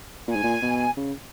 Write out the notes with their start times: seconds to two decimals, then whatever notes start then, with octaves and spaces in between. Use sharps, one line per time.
0.28 A#2 G#5
0.35 G#2
0.43 A#2
0.62 B2
0.96 C#3